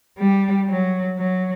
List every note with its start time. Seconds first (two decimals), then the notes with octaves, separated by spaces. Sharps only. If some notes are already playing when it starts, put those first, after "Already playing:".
0.19 G3
0.68 F#3
1.18 F#3